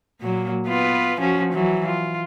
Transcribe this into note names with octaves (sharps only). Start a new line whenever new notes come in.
A#2 F#3 A#3
B3 F4 B4
F3 C#4 F#4
E3 F#3
F4